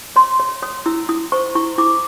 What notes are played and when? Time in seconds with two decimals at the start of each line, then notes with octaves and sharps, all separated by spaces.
0.16 C#5 C6
0.39 C#5
0.62 C#5 D#6
0.86 E4 E6
1.09 E4 D#6
1.32 C5 C#6
1.55 E4 C#6
1.78 E4 D6